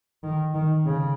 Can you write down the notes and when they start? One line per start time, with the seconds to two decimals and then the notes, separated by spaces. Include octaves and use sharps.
0.23 D#3
0.54 D#3
0.85 C#3